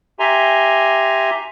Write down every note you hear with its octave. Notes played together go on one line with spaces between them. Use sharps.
G4 E5 G#5 A#5 C6